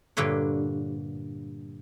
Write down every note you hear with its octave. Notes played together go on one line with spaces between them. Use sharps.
G2 A#2 D3 B4 C#5